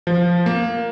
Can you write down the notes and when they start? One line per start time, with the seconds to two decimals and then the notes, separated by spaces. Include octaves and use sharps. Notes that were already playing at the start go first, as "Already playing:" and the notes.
0.07 F3
0.46 A#3